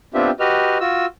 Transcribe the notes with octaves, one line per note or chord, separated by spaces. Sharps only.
B3 C4 D4 F4 G4 E5
F#4 G4 B4 D#5 F6
F4 F#4 E6